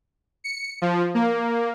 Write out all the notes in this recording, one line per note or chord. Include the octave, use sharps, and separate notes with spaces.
C#7
F3
A#3